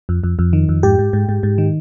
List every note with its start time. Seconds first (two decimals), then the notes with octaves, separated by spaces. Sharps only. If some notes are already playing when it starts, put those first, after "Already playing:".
0.09 F2
0.24 F2
0.39 F2
0.53 D#3
0.69 F2
0.83 G#2 G4
0.99 G#2
1.13 G#2
1.29 G#2
1.43 G#2
1.58 D#3